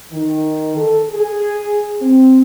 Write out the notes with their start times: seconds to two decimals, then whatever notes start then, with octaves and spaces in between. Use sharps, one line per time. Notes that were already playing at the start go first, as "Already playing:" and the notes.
0.12 D#3
0.77 A4
1.10 G#4
2.02 C4